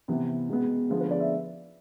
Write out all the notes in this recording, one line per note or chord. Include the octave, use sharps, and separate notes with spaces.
C3 E3 B3
B2 G#3 B3
D3 F3 G#3 B3 G#4
B4
D5
E5